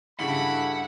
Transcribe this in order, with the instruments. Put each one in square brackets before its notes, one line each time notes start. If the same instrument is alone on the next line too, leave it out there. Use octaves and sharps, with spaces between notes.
[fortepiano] G2 C#3 [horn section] E4 A4 B5 [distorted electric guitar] F#5